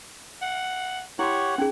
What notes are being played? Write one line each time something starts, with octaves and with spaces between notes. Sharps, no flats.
F#5
E4 G4 C#5 F#5 C6 C#6
C#4 D#4 G#4